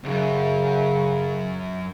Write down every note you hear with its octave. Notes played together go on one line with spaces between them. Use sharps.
C2 F#2 C#3